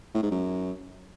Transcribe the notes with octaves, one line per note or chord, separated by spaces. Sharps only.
A2
G#2
F#2